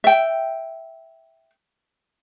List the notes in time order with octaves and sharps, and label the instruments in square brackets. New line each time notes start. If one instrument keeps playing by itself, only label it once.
[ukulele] E5 G5